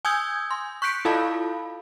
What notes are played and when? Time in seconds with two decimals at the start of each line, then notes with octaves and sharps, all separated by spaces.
0.05 G#5 D#6 E6 G6 G#6
0.51 C6
0.82 C#6 F#6 G6 B6 C#7 D7
1.05 E4 F4 A4 F5 A5 B5